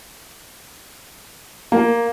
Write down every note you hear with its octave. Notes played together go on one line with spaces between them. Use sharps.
A#3